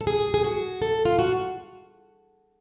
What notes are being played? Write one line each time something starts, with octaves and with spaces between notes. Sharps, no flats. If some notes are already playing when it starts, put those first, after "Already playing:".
A4
G#4
G#4
F#4
A4
F4
F#4